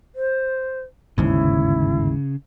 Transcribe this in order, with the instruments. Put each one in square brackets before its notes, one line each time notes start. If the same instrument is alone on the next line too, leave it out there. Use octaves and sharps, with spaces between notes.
[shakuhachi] C5
[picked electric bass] G1 D#2 G#2 [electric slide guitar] C#3 [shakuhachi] E4